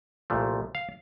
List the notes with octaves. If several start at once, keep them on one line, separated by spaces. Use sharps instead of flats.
C2 A#2 F3 A3
F5